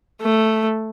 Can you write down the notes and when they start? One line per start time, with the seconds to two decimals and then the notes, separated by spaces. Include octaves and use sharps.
0.22 A3